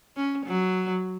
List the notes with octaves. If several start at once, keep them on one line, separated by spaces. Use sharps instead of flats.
C#4
F#3